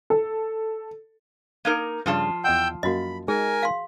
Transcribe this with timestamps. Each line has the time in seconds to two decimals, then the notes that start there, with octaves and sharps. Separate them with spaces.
0.10 A4
1.65 A#3 D#4 A#4
2.06 G2 C#3 F3 G3 F4 A5
2.44 E2 D#5 F#5 G5 E6 G6
2.83 F#2 A#3 F#4 D#5 B5
3.28 G#3 D#4 G#4 A#4 G#5
3.63 F5 C6